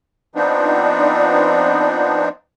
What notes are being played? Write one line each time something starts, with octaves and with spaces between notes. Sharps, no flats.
F3 B3 C4 D4 D#4